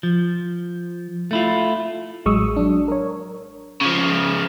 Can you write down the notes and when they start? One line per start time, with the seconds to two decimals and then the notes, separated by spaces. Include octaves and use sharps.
0.03 F3
1.31 A3 E4 F4
2.25 A1 F#3 G#3 C#6 D#6 E6
2.56 F#3 D4
2.88 A#4 C#5
3.81 C#3 F3